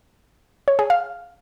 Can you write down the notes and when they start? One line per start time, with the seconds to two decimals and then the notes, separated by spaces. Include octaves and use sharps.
0.68 C#5
0.79 G#4
0.90 F5